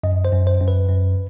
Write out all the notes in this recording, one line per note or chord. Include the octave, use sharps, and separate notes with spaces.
F#2 D#5
C5
F#2
C5
F#2
B4
F#2